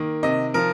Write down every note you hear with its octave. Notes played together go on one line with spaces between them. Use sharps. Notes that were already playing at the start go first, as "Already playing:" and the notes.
Already playing: D#3 A#3
C3 D#5
F3 A#4